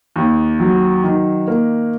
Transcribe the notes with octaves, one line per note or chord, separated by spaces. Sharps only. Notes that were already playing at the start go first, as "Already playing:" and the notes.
D#2
F#3
D#3
A#3